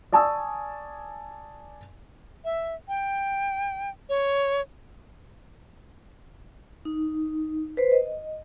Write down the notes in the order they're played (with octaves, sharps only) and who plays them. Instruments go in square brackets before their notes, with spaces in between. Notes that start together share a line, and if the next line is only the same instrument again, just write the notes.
[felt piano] D5 G#5 A5 C#6 D#6 E6
[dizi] E5
G5
C#5
[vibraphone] D#4
B4 C5
D#5